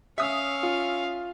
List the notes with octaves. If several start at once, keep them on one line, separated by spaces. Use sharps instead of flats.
C#4 E5 F5 D#6
F4